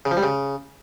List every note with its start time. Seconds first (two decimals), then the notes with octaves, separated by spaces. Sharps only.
0.05 C#3
0.11 F3
0.17 G3
0.23 C#3